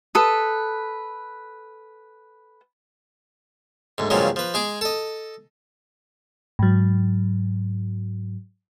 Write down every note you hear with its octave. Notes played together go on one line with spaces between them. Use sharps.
A4 B4 D#6
D2 G#2
G2 A#2 C#3 F3 F#3 G#3
F3 B4
G#3 G#4 D6
A4 D#5
G#2 F#3